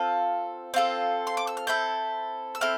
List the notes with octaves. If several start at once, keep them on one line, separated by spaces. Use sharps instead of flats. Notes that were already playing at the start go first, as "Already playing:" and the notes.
Already playing: C4 F4 A4
C4 F4 A4
C6
D6
E6
F6
C4 E4 A4 G6
E6
C4 E4 A4 F6